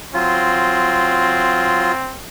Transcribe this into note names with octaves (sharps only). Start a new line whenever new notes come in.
F#3 C4 F4